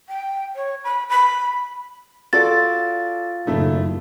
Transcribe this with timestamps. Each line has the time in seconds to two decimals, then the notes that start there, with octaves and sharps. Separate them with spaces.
0.08 G5
0.55 C#5
0.84 B5
1.09 B5
2.33 F4 F#4 A4 D5 A6
3.47 F#1 A2 D#3 A3